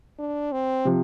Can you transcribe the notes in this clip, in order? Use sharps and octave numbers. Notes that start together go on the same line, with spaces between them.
D4
C4
C3 F3